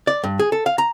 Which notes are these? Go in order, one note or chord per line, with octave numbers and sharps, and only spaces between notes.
D5
G2
G#4
A4
F5
A#5